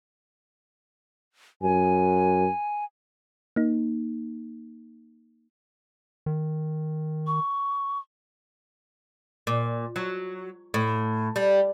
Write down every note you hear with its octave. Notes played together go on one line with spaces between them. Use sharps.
F#2 G#5
A#3 D#4
D#3
C#6
A#2
F#3
A2
G3